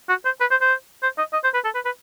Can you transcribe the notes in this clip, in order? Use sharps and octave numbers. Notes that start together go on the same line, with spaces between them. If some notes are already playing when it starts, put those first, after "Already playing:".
F#4
C5
B4
C5
C5
C5
D#5
D#5
C5
B4
A4
B4
B4